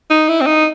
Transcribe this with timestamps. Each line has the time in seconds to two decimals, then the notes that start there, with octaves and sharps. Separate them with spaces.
0.10 D#4
0.28 E4
0.41 C4
0.46 D#4